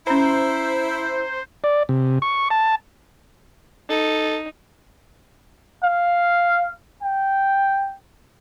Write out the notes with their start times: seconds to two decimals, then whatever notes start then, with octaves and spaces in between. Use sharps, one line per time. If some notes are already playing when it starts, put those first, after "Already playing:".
0.07 C#4 E4 C5 A#5 B5
1.64 D5
1.89 C3
2.22 C#6
2.50 A5
3.90 D#4 A4
5.84 F5
7.02 G5